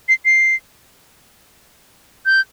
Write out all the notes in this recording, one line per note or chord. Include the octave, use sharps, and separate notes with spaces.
C7
C7
G6